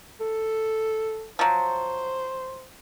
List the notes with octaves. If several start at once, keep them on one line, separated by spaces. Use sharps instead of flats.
A4
F3 F#3 C5